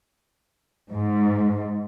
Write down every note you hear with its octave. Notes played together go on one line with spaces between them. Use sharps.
G#2